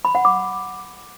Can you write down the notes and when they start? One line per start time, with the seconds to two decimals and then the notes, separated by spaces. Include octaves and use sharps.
0.05 B5
0.15 F#5
0.25 D6